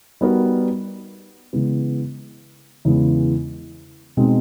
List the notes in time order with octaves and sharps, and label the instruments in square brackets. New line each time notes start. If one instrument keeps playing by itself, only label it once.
[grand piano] G3 B3 D#4 F#4 A#4
C#3 E3 G#3 B3
E2 C#3 E3 G#3 B3
B2 G#3 C4 D#4